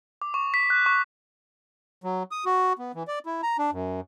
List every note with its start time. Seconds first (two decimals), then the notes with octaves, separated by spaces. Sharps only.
0.22 D6
0.34 C#6
0.54 B6
0.70 F#6
0.86 C#6
2.04 F#3
2.31 D#6
2.45 F#4
2.79 B3
2.95 E3
3.08 D5
3.26 E4
3.43 A#5
3.58 D4
3.72 F#2